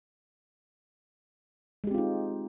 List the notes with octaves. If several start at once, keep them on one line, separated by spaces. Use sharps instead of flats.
G#3 C4 D#4 F4 G4